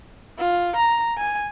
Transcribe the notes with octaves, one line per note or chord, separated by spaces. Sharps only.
F4
A#5
G#5